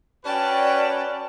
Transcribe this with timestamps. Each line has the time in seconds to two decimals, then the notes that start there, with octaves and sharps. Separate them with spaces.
0.25 C#4 F#4 B4 D5 G5 A5